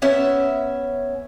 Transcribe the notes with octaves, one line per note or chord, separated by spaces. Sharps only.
B3 C#4 E5